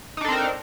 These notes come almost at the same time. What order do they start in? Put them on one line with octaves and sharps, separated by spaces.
D#4 D4 A4 C4 A#4